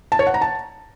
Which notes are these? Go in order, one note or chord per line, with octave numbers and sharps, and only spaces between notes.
A5
C#5
F#5
A#5
A5